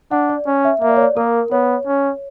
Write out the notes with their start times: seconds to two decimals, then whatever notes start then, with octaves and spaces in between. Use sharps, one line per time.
0.11 D4 F#5
0.29 D5
0.46 C#4
0.65 E5
0.81 A#3 E5
0.89 D5
0.96 C#5
1.02 D5
1.16 A#3 A#4
1.51 B3 C#5
1.87 C#4